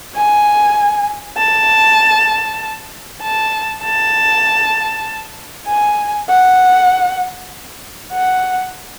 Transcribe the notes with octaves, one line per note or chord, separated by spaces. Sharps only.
G#5
A5
A5
A5
G#5
F#5
F#5